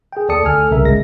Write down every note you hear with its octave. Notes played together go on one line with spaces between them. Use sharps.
G#4 G5
D#2 A4 D5 A5 D#6 C#7
D2 A4 G#5 F6
C2 C#3 A#4 E5
G#1 D2 G#3 A#6